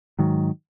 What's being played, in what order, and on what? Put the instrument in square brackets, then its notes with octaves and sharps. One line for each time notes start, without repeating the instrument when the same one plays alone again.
[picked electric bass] G#2 D#3 F#3